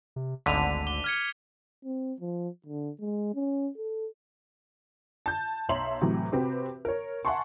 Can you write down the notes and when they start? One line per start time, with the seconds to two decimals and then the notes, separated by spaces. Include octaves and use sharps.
0.16 C3
0.46 G#1 D2 D3 B6 D#7 F7
0.87 D6 G7
1.04 F6 G#6 C#7
1.84 C4
2.21 F3
2.66 D3
3.00 G#3
3.35 C#4
3.77 A4
5.26 A5 G6
5.69 B1 C#5 E5 A#5 C6 F#7
6.01 A2 C3 E3 F#3
6.32 C3 C4 F#4 B4
6.85 A#4 C#5
7.25 E5 F#5 G#5 A5 C6 C#6